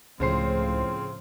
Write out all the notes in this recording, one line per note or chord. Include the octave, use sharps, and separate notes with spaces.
C#2 A2 C#3 F3 C4 C5 C7